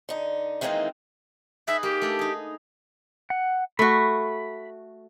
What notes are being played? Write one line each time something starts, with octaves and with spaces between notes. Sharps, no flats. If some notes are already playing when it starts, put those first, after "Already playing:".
D3 D#4
D#3 E3 G#3 A#3 C4 D#4
D#4 G#4 B4 E5
A#3 G4
A3 D4 B4
D#4 G#4
F#5
A3 F#4 B5